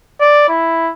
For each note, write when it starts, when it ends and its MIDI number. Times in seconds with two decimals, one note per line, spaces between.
0.20 0.47 74
0.49 0.91 64